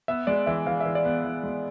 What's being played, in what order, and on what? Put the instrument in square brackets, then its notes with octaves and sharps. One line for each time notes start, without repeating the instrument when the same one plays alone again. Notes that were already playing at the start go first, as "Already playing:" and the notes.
[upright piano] B3 [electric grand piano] E5
[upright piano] G#3 [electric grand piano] D5
[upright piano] E3 [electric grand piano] E5
[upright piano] E3 [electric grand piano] F5
[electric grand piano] E5
[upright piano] E3
[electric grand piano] D5
[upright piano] B3
E3
G#3